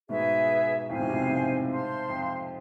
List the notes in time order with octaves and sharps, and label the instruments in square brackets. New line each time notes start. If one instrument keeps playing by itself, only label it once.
[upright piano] G#2 B2 [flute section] G#4 B4 E5
[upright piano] F2 A2 [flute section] C5 F5 G#5
[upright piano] G#2 B2
A2 C3
F2 A2
G#2
[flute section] C5 F5 A5 C6
[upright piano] F2